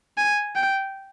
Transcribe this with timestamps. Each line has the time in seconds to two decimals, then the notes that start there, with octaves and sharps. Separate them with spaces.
0.18 G#5
0.55 G5